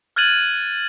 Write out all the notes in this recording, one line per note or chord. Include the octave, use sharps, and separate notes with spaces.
F6 F#6 G#6 A6 D#7 F#7